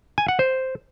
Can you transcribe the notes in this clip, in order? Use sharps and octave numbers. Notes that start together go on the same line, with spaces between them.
G#5
F#5
C5